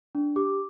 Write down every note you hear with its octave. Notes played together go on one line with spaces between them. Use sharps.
D4
G4 D6